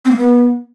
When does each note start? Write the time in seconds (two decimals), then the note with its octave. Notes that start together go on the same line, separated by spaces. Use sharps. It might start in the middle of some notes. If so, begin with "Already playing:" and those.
0.05 C4
0.11 A#3
0.17 B3